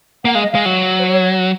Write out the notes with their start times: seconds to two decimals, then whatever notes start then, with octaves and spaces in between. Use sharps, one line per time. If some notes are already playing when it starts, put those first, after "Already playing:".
0.25 A#3 F#5
0.33 G#3 F5
0.42 D#5
0.50 G#3 F5
0.65 F#3
0.99 C5
1.06 C#5